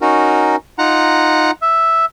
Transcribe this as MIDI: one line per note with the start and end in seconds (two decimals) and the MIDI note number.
0.01 0.56 61
0.01 0.56 63
0.01 0.56 66
0.01 0.56 70
0.79 1.51 63
0.79 1.51 65
0.79 1.51 78
0.79 1.51 82
1.62 2.05 76